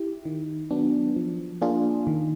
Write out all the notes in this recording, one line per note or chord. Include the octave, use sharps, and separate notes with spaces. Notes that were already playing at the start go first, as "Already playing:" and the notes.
Already playing: E4 G4
D#3
F#3 B3 D4
F3
A#3 D4 F4 G#4
D#3